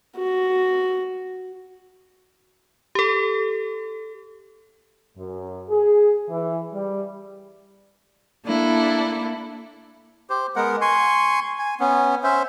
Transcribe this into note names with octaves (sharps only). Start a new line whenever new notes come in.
F#4
G4 A4
F#2
G#4
E3
G3
A#3 D4 E4 A4
G4 C5
G#3 B3 A#4 F#5
G#5 C6 C#6
G#5
B3 C#4
C#4 C5 E5